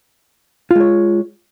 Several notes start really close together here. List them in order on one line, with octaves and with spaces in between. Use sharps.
F4 G#3 C#5